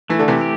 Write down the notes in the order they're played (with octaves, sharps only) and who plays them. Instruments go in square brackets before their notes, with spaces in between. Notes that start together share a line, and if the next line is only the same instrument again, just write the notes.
[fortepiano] E3 [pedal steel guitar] A3
[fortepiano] D3
C3 E3
[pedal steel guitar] G4